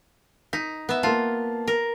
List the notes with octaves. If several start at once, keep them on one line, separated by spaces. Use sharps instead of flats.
D#4 B6
B3 E5
A#3 F4 A5
A#4